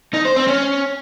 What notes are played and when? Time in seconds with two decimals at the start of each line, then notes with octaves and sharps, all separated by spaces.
0.14 D#4
0.25 C5
0.36 C4
0.48 C#4